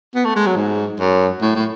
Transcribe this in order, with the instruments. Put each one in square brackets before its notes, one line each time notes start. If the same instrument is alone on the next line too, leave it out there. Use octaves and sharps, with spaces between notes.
[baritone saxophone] B3
A3
G#3
F#3
G#2
F#2
A2
A2